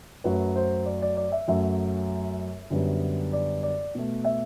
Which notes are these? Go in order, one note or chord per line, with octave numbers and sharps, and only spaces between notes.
F#2 F#3 A3 B4
C5
D5
D5
D5
E5
F#2 F#3 A3 E5
F#2 D3 G3 B3
D5
D5
B2 A3
E5